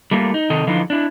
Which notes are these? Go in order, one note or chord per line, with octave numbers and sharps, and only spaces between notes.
G3 A3 A#3 F4
D#4
C3 D#3 A4 D#5
D3 E3 F3 D#4 F4
D4 E4